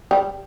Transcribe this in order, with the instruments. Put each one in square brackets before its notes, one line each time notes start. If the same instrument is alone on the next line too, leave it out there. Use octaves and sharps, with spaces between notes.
[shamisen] G3